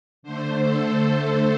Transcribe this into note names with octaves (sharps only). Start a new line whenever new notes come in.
D3 A3 C5
A4